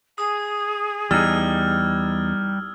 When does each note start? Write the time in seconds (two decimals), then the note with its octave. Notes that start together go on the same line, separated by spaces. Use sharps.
0.18 G#4 D#6
1.11 E2 G3 D#4 E6 F6 G#6